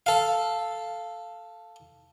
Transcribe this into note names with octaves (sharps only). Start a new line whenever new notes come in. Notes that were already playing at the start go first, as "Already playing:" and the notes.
A4 F5